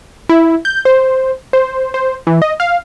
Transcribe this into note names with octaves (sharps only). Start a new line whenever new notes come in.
E4
G6
C5
C5
C5
E3
D#5
F5